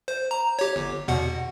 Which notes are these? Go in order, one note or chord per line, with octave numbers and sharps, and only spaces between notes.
C5
A#5
G4 C#5
G1
E2 B2 F#5